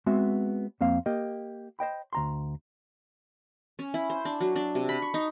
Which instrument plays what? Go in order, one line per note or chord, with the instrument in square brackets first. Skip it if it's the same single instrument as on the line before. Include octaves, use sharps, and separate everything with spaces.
[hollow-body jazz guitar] G#3 B3 C4 F#4 E5
F2 A#3 C4 F5
A#3 G4 D#5
C5 D#5 G5 B5
D2 A#5 C6
[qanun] C#4
E4
C5
D4
F#3
D4
C3
B5
C#6
D#4